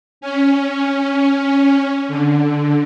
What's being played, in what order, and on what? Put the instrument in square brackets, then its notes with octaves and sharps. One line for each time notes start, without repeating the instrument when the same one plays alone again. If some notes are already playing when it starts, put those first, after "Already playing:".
[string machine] C#4
D3